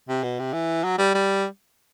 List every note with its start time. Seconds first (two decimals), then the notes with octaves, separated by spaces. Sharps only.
0.09 C3
0.23 B2
0.39 C3
0.53 E3
0.84 F#3
0.98 G3
1.14 G3